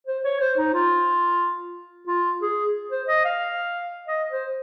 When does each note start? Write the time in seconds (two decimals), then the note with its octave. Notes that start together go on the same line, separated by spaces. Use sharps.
0.07 C5
0.24 C#5
0.40 C5
0.57 D#4
0.74 F4
2.07 F4
2.42 G#4
2.91 C5
3.08 D#5
3.25 F5
4.07 D#5
4.30 C5